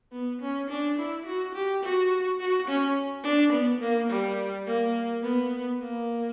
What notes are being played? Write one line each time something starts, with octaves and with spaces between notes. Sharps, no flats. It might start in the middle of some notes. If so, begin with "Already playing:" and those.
B3
C#4
D4
E4
F#4
G4
F#4
F#4
C#4
D4
B3
A#3
G3
A#3
B3
A#3